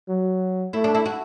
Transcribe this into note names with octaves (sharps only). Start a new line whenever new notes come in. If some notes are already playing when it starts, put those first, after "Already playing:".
F#3
A3 E4
D4
E4
F#4